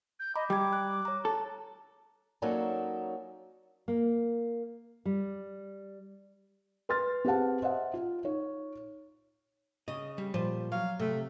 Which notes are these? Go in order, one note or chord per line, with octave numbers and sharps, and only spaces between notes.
G6
D#5 A#5 B5 D6
G3 G5 D6 G#6
F#6
C#5 A#5
A4
F#3 A#3 C#4 D#4 A4 D5
A#3
G3
B4 C6 F6 A6
C4 G4 G#4 B4 F#5 A5
C5 D#5 E5 F#5
F4
D#4 C#5
C#3 D#5
G3
A#2 F3 G3 C5
F#3 F5
C3 A3